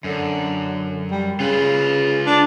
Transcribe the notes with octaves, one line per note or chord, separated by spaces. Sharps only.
F#2 D3
G3
C#3 F4 B4
D4